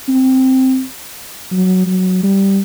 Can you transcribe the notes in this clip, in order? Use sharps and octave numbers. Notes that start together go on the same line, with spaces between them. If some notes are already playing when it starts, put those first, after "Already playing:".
C4
F#3
F#3
G3